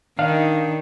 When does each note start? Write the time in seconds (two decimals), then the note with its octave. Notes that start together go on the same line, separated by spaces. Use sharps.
0.19 D#3 D4 D#4 F5